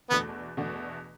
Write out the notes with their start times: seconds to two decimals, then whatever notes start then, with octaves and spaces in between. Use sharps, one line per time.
0.10 E2 B2 A3 B3 D4 F#4
0.57 E2 B2 A3 D4 F#4